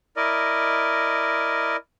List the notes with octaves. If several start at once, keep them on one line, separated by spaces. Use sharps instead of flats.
E4 A#4 D5 D#5